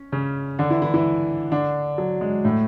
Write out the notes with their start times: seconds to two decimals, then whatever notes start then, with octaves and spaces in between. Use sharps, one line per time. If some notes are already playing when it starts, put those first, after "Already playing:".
Already playing: C#4
0.12 C#3 C#4
0.59 D3 D4
0.70 E3 E4
0.82 E3 E4
0.94 E3 E4
1.52 D3 D4
1.98 F#3
2.21 G#3
2.45 A2 A3